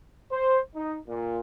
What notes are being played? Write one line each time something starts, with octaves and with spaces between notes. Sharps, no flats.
C5
D#4
A#2